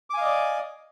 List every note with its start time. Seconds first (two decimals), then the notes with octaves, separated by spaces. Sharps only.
0.10 D6
0.14 G#5
0.17 F5
0.21 D#5
0.25 D5